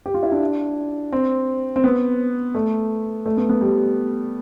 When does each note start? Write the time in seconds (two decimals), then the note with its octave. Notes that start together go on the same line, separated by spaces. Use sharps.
0.06 G4
0.14 F4
0.23 E4
0.32 D4
1.12 C4
1.76 C4
1.84 B3
2.55 A3
3.26 A3
3.37 B3
3.49 B3
3.61 G3